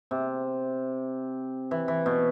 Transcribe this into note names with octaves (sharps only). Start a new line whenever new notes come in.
C3
E3
E3
B2